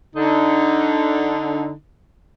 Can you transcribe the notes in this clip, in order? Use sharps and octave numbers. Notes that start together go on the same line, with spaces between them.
D3 D#4